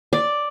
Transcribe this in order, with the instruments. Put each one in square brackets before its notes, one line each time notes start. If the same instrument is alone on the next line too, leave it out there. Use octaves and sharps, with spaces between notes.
[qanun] D5